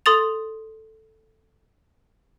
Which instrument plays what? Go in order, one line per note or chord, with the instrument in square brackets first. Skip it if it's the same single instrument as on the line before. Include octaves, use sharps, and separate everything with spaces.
[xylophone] A4 C6 D#6 A6 F7